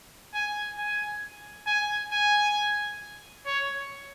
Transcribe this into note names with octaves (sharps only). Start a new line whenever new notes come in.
G#5
G#5
G#5
G#5
C#5